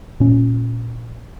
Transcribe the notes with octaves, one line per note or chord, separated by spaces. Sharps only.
A#2 C#4